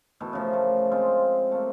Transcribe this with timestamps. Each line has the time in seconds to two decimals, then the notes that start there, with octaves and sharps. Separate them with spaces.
0.20 B2 E3 A3
0.33 C#3 E3 F3 A#4
0.53 A3
0.92 G#3 C4 F4
1.51 A3 A#3